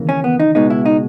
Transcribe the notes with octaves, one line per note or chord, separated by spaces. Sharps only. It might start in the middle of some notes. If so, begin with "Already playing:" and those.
Already playing: D#2 C#3 E3 A#3
C#4
B3
D#4
C#2 B2 G#3 B3 D#4
E4
D#4